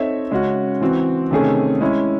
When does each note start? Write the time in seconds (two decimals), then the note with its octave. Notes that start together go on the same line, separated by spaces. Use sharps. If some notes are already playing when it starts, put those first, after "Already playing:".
Already playing: C4 D#4 A4 C#5 E5
0.31 C#3 G#3 C#4 F#4
0.81 E3 C4 F#4
1.31 C3 D#3 A3 C#4 G#4
1.81 G#3 C#4 E4